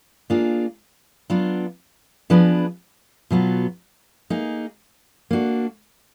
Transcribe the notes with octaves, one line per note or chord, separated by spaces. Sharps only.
A#3 D4 F4 G#4
F#3 B3 D4 F4
F3 B3 D4 G#4 B4
B2 F#3 B3 F4
A#3 D#4 G#4
A#3 D4 F#4